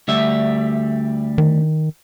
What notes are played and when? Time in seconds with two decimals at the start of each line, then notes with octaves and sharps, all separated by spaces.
0.08 D2 G3 E5
1.38 D#3